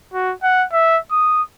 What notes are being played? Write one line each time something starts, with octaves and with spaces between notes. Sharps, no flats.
F#4
F#5
E5
D#6